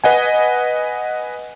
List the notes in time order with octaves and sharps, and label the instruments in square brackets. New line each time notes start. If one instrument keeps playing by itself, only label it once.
[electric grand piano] B4 D#5 F#5 G#5